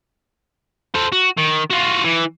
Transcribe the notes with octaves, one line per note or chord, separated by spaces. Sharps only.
A4 C5
F#4
D#3
F4 F#4
E3